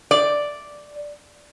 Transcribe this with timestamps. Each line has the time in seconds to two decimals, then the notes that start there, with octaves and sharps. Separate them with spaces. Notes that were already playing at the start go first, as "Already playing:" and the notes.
0.11 D5